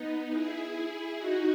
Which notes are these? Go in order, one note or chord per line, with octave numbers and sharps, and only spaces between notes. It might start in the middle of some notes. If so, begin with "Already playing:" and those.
Already playing: B3 D#4
E4 G#4
D#4 F#4